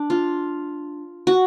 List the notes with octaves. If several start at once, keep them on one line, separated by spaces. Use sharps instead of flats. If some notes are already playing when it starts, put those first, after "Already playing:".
Already playing: D4
F4
F#4